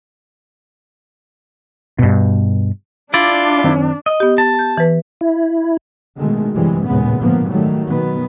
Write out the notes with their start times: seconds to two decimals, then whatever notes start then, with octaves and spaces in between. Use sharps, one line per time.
1.99 G2 B2
3.14 D4 E4 F4 D5
3.64 F#2 D#3 C4
4.06 D#5
4.20 B3 G4
4.38 A5
4.59 G6
4.77 E3 B4
5.21 E4
6.16 B2 D3 D#3 G#3 A3
6.53 F#2 C3 E3 G3 G#3
6.86 A1 D#2 A#2 C#3 G#3 B3
7.18 G#2 D3 F3 A#3 B3
7.50 D#3 F#3 G3 A3
7.87 B2 D#3 F#3 B3